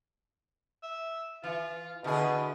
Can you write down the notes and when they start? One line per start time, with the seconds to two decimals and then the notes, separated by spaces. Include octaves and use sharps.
0.83 E5
1.44 E3 F4
2.04 B2 D3 E3 G#4